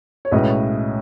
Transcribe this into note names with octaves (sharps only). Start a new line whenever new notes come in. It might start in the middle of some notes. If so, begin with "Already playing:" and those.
C#5
B1 A2 G#3 C#4 B4 D#5